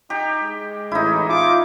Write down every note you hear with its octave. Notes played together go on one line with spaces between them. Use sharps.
D#4 G4
G#3
A1 D#4 E4
F4 D6